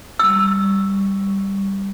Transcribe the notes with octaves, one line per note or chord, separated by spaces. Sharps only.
G3 C#6 E6